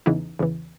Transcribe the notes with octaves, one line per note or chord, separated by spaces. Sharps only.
E2 C#3 E3 D#4
E2 C#3 E3